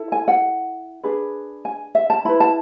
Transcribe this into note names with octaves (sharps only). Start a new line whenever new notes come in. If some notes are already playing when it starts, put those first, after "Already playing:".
Already playing: E4 A4
G#5
F#5
D4 G#4 B4
G#5
E5
A5
E4 B4 B5
A5